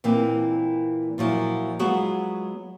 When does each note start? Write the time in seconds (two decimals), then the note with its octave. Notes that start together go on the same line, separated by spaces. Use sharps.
0.04 A#2 E3 A#3 C4
1.18 A#2 F3 F#3 E4
1.79 F#3 G#3 B3 F4 F#4 G#4